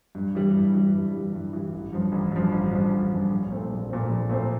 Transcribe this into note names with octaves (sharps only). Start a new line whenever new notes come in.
G2
E3 G3
G2
E3 G3
G2
E3 G3
G2
E3 G3
A1
G2 F3
A1
G2 F3
A1
G2 F3
A1
G2 F3
A#1
A#2 A3 C4
A#1
A#2 A3 C4
A#1
A#2 A3 C4